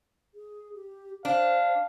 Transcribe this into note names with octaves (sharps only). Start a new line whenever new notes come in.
G#4
G4
D4 C5 F5